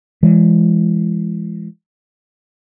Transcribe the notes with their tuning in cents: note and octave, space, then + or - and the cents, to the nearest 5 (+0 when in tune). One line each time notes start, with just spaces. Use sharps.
E3 +35 G#3 +0